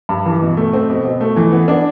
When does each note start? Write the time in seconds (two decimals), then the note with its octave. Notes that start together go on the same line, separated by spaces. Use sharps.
0.09 G2
0.26 E3
0.42 B2
0.57 A3
0.73 C4
0.90 B2
1.05 B2
1.21 A3
1.37 E3
1.52 B3
1.68 D4